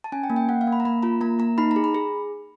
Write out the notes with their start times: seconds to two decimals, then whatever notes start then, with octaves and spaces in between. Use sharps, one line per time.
0.04 A5
0.12 C#4 G#5
0.24 G5
0.30 A#3
0.36 G5
0.49 A#3 F#5
0.61 F5
0.67 A#3
0.73 B5
0.80 A#5
0.85 A#3 B5
1.03 F4 A#5
1.21 A#3 A#5
1.39 A#3 A#5
1.58 D#4 B5
1.71 A#5
1.76 G#4
1.84 B5
1.95 G#4